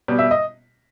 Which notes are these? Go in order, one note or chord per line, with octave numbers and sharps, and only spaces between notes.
B2 G3
E5
D#5